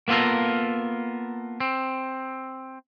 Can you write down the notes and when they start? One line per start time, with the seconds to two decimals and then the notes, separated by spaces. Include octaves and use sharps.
0.08 A#3 B3 F4 A4 A#4
1.60 C4